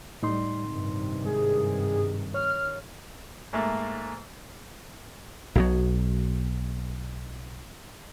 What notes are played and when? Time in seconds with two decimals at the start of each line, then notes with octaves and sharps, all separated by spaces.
0.23 A2 G3 D#4 C6
0.67 G2 C3 D#3
1.25 G#2 G#4
2.34 C#5 F6
3.53 G#2 A3 A#3
5.55 B1 B2 F#3